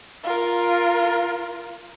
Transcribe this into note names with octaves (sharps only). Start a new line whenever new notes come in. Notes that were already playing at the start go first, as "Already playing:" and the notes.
F4 A#4